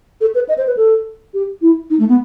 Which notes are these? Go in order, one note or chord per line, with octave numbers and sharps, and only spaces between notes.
A4
B4
D#5
C5
B4
A4
G4
E4
D#4
A3
B3